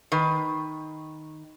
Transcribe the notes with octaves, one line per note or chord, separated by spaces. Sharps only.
D#3 B4